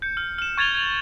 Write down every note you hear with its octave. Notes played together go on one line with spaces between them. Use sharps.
G6 C#7
F6
F6 E7
C#6 G#6 A6 F7 G7
G#6 F7 F#7